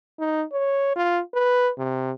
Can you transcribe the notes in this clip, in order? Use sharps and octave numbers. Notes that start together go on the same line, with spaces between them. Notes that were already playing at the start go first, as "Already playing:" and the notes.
D#4
C#5
F4
B4
C3